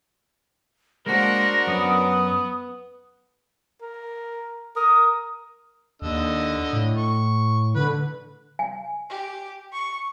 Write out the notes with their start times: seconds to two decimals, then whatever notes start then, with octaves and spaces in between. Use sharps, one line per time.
1.06 G#3 A#3 D4 F#4 A#4 C5 F#5 A#6
1.67 F#2 B3 C#4 D#6
3.82 A#4
4.76 A#4 D#6
6.02 D#2 D3 D#5 E6
6.73 A2
6.98 C#6
7.76 D3 B4
8.59 G#5
9.10 G4
9.72 C#6